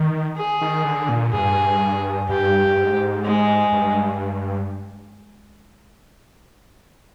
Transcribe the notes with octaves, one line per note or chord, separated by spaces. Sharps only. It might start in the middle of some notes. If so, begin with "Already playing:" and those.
Already playing: D#3
G#4
D#3
D3
A#2
G2 G#4
G2 G4
G2
G#2
G#3
G2